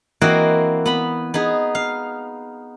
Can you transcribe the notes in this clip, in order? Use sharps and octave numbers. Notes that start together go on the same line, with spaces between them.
E3 A#3 C4 E4 F#4 D#5
B3 B5
B3 D#4 G#4
F5